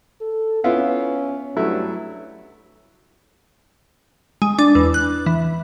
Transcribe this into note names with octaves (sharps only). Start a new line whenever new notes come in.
A4
B3 C#4 E4 F4
G2 F#3 A3 E4
G#3
D4
E2
F#6
E3